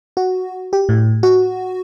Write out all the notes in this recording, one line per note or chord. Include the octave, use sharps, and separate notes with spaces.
F#4
G4
A2
F#4